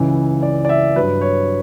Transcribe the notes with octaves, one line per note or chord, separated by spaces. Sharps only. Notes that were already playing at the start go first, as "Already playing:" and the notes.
Already playing: C#2 C#3 E3
D5
D5
E5
G2 F#3 B4
C#5